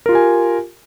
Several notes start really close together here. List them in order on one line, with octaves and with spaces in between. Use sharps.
A#4 F4 G4 G#5